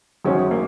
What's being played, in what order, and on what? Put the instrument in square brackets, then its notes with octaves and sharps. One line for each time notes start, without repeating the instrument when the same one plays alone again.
[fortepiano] F#2 D#3 G#3 C4 F#4 [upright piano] C#4
[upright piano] A#3